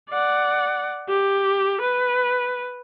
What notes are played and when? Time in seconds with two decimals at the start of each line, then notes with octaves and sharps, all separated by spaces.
0.10 D5 F#5
1.09 G4
1.81 B4